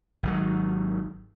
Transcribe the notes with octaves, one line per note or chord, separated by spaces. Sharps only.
G#1 D#3 F#3